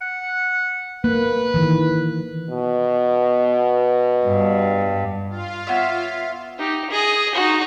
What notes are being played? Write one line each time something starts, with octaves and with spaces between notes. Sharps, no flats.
F#5
A#3 B4
D#3 E3
B2
G2
F4 F5
B3 C#4 E5
D#4 G4
G#4 D#5
D#4 F#4